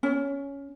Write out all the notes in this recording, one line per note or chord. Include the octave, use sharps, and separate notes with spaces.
C#4